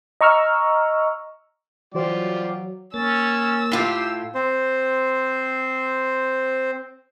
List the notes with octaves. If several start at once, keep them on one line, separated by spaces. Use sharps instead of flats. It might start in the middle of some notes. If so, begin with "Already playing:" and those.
D#5 A#5 C#6 E6 F6
E3 F#3 F4 F#4 C5 D5 G5
A#3 C#4 E6 A6
A2 F4 G4
C4 C5